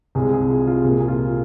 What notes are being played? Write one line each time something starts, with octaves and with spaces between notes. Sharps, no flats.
C2 C3 G#3 G#4
G#4
F4
F4
C2 A#2 A#3 G#4
G#4
F4